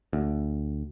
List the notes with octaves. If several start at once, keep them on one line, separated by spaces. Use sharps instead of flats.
D2